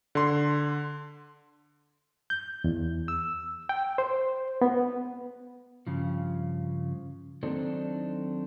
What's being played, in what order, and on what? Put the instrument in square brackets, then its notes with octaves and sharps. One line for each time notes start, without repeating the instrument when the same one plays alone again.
[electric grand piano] D3 C6
[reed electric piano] G6
E2
E6
G5
C5
B3
[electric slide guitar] G2 C#3 F3
D#3 F#3 C4 D4 D#4 A4